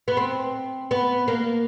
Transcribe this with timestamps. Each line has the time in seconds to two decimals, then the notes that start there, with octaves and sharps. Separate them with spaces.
0.08 B3
0.17 C4
0.91 B3
1.28 A#3